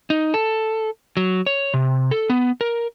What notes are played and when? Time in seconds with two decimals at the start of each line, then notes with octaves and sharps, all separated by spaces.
0.10 D#4
0.34 A4
1.17 F#3
1.46 C#5
1.74 C3
2.11 A4
2.30 B3
2.61 A#4